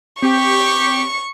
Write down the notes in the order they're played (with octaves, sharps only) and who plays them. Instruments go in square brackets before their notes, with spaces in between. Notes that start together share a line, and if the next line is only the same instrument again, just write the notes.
[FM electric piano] C4 [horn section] G4 [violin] C#6 C#7